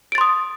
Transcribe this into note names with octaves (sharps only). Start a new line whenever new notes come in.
C6 D#6 A6 D7